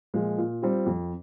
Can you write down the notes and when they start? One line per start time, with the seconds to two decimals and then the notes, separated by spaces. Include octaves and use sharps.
0.14 A#2 F3 G#3
0.38 A#2
0.62 G3 C4 F4
0.86 F2